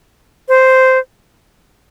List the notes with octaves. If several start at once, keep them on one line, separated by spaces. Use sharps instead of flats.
C5